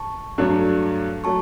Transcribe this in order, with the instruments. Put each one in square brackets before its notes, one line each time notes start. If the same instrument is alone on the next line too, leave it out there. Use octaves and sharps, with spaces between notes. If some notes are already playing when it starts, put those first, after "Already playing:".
Already playing: [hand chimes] A5 C#6
[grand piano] G2 F#3 A3 D4
[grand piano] F#3 A3 [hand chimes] A5 C#6